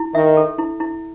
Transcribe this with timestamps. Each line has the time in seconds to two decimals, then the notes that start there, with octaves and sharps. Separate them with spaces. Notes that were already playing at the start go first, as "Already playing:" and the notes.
Already playing: E4
0.15 D#3 E5
0.37 A4
0.58 E4
0.80 E4